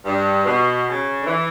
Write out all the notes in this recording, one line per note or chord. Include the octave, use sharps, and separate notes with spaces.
G2
B2
C#3
D3
E3